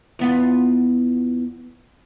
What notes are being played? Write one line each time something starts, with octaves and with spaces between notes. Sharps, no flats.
E2 B3 F4